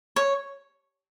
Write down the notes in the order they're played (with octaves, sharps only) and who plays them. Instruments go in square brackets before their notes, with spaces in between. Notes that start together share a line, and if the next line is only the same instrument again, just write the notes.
[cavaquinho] C#5